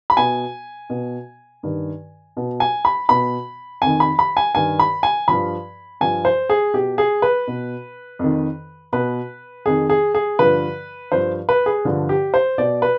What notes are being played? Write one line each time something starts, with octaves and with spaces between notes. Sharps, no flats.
B5
B2 G#5
B2
G2 D#3
B2
G#5
B5
B2 B5
F2 D#3 G#5
B5
B5
G#5
G2 D#3 G#5
B5
G#5
G2 F3 B5
G2 F3 G#5
C5
G#4
B2 G4
G#4
B4
B2
F2 D#3
B2 B4
F2 D#3 G#4
G#4
G#4
G2 D3 F3 B4
G2 F3 C5
B4
G#4
G2 D3 F3
G4
C5
B2 D5
B4